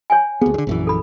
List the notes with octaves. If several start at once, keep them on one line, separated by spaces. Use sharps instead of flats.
C#5 G5 G#5
D2 B3 G#4
G2 D3
A#1 F#2 E3
A4 B5